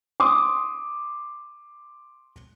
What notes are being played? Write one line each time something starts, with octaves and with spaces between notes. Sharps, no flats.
C6 D6 D#6